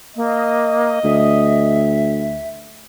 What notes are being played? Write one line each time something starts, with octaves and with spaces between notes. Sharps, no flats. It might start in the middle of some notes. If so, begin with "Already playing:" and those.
A#3 D#5
D2 E5